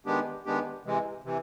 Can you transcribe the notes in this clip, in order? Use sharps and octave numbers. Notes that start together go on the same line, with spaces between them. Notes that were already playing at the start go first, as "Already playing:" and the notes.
D#3 G#3 B3 D4 G4
D#3 G#3 B3 D4 G4
C3 E3 G#3
C3 E3